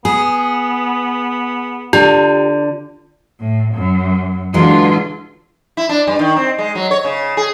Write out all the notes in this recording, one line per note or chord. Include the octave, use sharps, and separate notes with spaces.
B3 G#4
D3 F4 G4
A2
F#2
D3 E3 F#3 G#3 F4
E4
D4
G2
D#3
C4
G#3
F#3
C#5
C#3
G#4